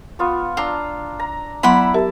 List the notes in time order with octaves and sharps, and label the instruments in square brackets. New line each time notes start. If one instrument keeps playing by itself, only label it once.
[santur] B3 F4 C#6
[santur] D4 A#5 E6 [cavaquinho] F4
[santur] A#5
[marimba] F#3 B3 C6 [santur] E4 E5 [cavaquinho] D5 F#5 B5
[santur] E4 A5 [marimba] G4 A#4 E5